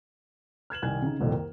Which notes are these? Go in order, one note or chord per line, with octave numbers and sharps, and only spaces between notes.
F6 G#6 E7 F#7
C2 D#3 G#5 G#6
C#3 D#4
D#1 C2 F2 D#3 A#3 A4
A#4